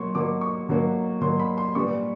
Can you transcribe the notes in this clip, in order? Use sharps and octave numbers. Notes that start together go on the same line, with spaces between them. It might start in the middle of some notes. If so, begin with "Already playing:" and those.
Already playing: B2 F#3 A#3 C6 C#6
B2 F#3 A#3 D6
C#6
B2 F#3 A#3
B2 F#3 A#3 C6
B5
C6
A#2 G3 B3 C#6